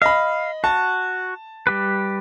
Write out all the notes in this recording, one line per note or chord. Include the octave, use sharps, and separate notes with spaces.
D#5 F5 B5
F#4 A5
G3 G4 B4